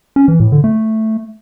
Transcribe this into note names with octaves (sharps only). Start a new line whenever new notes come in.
C#4
E3
A2
D3
A3